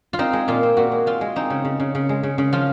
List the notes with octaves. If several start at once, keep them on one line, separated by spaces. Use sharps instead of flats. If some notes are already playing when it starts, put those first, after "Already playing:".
F4
C4 D#4
G#3
A#2 F4
C4
A#2 F#4
G#3
C4 F4
G#3
C4 D#4
C#3
C#3
C#3
C#3
G#3
C#3
C#3
F3 F4